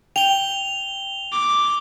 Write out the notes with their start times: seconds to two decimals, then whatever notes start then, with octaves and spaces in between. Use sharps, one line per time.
0.16 G5 F7 G7
1.32 D6